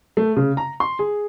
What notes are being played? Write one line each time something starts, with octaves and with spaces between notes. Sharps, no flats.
A3
C#3
A#5
C6
G#4